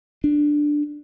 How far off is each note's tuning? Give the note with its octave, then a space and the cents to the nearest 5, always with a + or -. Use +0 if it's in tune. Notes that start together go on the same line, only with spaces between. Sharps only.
D4 +5